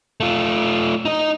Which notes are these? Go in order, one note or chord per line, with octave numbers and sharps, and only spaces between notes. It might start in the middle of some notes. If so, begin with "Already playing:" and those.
A3 F4
D#4 D#5